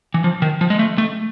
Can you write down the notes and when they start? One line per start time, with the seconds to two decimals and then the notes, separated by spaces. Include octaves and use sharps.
0.14 E3
0.24 F3
0.42 D#3
0.61 F3
0.70 G#3
0.79 A3
0.98 A3